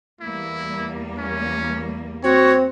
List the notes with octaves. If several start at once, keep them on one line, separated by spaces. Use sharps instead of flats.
E2 G3 A#3 E4
C#4
C4 F#4 C#5